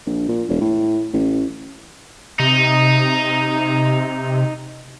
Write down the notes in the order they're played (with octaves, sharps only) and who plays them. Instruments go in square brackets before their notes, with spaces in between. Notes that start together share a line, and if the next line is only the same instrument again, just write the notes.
[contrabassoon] A#1
A#2
E1
A2
A1
[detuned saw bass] C3 [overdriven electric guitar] D#4